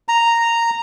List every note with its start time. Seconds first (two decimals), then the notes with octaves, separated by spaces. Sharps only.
0.09 A#5